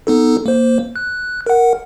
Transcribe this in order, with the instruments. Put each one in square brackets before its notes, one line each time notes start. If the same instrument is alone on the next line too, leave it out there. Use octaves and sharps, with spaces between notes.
[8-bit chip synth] B3 D#4 A4
A#3 C5
F#6
A#4 F#5